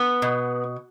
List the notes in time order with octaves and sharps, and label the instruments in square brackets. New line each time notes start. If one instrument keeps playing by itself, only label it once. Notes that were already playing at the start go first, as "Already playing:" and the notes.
Already playing: [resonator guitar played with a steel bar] B3
B2